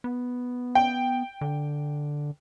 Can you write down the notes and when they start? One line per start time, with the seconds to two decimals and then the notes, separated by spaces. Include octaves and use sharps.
0.04 B3
0.75 G5
1.41 D3